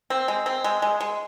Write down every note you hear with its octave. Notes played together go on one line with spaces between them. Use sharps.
C4
G#3
C4
G#3
G#3
G#3